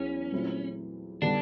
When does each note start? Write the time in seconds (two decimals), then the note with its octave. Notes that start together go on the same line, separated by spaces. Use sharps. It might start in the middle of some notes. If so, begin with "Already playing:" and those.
Already playing: E2 F#3 C#4
0.31 A#2 F#3 A3 C4 E4
1.22 D3 G3 B3 D4 D#4